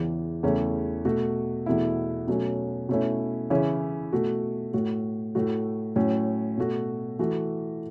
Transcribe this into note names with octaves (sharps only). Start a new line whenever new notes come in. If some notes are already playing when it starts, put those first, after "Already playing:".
Already playing: E2 C#3 E3
E2 C#3 A3 C#4 E4
B2 A3 F#4
E2 B2 A3 E4
B2 F#3 A3 C#4
B2 A3 C#4 E4
C#3 E3 C#4 E4
B2 A3 F#4
A2 A3 F#4
A2 A3 F#4
A2 F#3 C#4
B2 A3 F#4
E3 A3 F#4